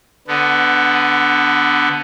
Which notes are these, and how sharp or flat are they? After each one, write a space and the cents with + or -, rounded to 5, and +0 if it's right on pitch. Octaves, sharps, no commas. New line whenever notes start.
D3 +0 B3 +10